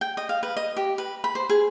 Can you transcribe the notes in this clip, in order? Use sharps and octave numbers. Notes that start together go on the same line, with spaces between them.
G5
D#5
F5
B4
D#5
G4
B4
B5
C5
G#4